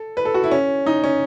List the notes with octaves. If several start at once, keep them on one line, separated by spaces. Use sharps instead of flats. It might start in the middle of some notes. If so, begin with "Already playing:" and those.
Already playing: A4
B4
A4
F#4
E4
C#4
D#4
C#4